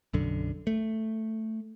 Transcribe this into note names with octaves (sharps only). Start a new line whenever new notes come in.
B1 F#2 D3
A3